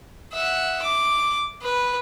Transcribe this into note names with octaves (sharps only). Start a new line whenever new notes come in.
E5 F#5
D6
B4